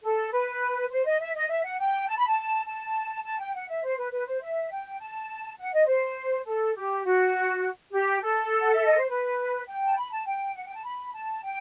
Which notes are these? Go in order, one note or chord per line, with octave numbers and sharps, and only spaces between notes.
A4
B4
C5
D#5
E5
D#5
E5
F#5
G5
A5
B5
A5
A5
A5
G5
F#5
E5
C5
B4
B4
C5
E5
G5
A5
F#5
D#5
C5
A4
G4
F#4
G4
A4
F#5
E5
D#5
C5
B4
G5
A5
B5
A5
G5
F#5
G5
A5
B5
A5
G5